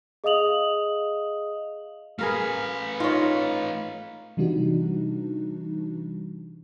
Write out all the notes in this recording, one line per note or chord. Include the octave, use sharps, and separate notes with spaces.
G#4 D#5 F5 D#6 F7 F#7
A3 G#4 A#4 B4 F5
D#4 F4 C#5
C3 E3 G3 D4 D#4 F#4